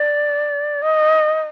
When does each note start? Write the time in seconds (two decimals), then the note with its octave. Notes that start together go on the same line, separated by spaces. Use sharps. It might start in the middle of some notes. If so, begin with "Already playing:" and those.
Already playing: D5
0.82 D#5